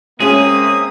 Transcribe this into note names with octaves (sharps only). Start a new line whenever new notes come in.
G#3 A#3 C4 C#4 G#4 E5 D#6